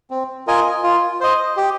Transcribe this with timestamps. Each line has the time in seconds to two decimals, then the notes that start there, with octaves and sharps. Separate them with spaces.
0.10 C4
0.47 F4 A#4 D#5 G#5
0.83 F4
1.21 C5 D#5
1.57 G4